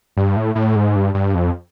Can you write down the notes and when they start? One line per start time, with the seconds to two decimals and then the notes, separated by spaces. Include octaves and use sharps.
0.17 G2
0.36 A2
0.55 A2
0.76 G#2
0.96 G2
1.14 G2
1.35 F2